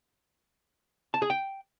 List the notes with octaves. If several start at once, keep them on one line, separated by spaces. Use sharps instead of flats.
A5
G#4
G5